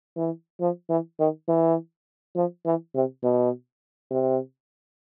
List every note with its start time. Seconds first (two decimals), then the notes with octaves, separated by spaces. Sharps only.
0.16 E3
0.60 F3
0.89 E3
1.19 D#3
1.48 E3
2.35 F3
2.65 E3
2.94 C3
3.23 B2
4.11 C3